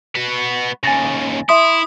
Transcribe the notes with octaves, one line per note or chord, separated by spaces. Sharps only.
B3 F#4
D#2 C#3 G#5 A6 A#6
E4 E5 C6 D#6 B6